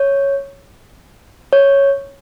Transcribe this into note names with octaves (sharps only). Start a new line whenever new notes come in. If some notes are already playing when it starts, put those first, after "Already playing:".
Already playing: C#5
C#5